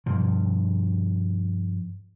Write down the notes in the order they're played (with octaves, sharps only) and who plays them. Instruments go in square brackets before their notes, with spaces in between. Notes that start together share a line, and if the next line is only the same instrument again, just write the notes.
[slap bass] G2 B2 F3